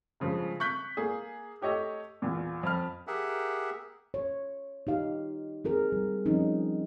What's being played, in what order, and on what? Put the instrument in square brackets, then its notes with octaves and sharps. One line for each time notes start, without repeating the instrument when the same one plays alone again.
[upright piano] G2 C#3 F3 G#3
C#6 F#6 G6 B6
A#3 G#4
A3 G4 C#5 D#5 E6
E2 A#2
F2 B5 F6
[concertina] G4 G#4 A#4 E5 F#5
[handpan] C#5
D#4 G4 F5
C4 G#4 A#4
G3
F3 G3 C4 C#4 D#4